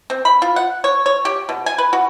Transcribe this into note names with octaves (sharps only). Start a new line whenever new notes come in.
C4
B5
F4
F#5
C#5
C#5
G4
B2
G#5
B4
F#4